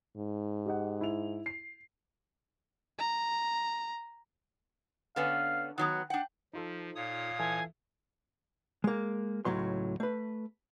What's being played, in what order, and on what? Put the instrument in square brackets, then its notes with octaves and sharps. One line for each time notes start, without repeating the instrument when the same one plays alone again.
[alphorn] G#2
[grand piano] G4 D#5 F#5
E4 F7
C7
[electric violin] A#5
[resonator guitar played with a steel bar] D3 B3 C#4 [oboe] F5
[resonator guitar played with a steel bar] D#3 F#3 B3 [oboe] F#5
[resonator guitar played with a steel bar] D4 F#5 [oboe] G5
[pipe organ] F3 [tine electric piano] D#4 F4 A4
[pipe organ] A#2 C#5 D#6 [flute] F5
[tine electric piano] E3 A4 E5 [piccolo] G#5
[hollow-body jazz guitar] G#3 A#3
C#2 A2 F#3 C6
A3 B4